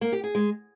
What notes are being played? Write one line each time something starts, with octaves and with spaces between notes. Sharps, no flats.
A#3
G4
G#4
G#3